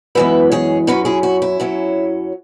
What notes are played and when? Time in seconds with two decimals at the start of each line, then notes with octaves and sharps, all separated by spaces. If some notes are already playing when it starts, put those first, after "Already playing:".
0.15 F#2 E3 G#3 B3 B4 E5
0.52 G#4 C#5
0.87 F#2 F#3 C#4 F#4 B4
1.05 E4 G#4
1.23 F#4
1.42 E4
1.60 F#2 F#3 C#4